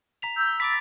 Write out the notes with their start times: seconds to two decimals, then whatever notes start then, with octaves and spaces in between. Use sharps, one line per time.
0.22 A#5 B6 F7
0.36 E6 G6
0.60 B5 D6 A6 B6 D7